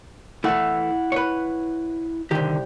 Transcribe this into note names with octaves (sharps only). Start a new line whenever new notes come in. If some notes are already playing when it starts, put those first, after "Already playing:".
E3 A3 E4 F#5
B4 C#5
C2 D3 D#3 G4